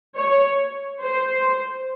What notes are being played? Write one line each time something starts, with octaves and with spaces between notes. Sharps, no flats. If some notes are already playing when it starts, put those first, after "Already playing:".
C#5
C5